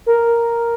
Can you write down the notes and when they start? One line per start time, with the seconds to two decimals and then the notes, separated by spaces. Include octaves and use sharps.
0.06 A#4